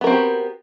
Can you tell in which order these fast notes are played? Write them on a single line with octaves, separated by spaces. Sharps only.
B3 A#4 C4 F#4 G4